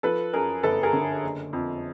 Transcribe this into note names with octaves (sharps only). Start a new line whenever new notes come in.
F3 A4 B4
F#2 G#4 A#4
G1 A4 B4
G#4 A#4
D3
F#1
F2